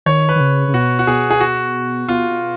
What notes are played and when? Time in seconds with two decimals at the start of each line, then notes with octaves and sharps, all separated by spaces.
0.06 D#3 C#5
0.29 B4
0.35 D#3
0.40 C#3
0.68 C#3
0.74 B2 F#4
0.99 F#4
1.07 B2 G#4
1.30 G#4
1.40 F#4
2.08 B2 F4
2.30 B2